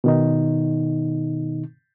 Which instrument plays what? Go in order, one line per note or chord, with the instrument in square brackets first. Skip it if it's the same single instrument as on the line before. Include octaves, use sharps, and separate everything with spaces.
[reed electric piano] B2 D#3 D#4